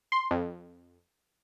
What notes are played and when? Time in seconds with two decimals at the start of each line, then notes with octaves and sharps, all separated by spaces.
0.12 C6
0.31 F2